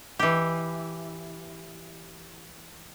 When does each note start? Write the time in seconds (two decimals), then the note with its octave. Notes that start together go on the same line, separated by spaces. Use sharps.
0.19 E3 G4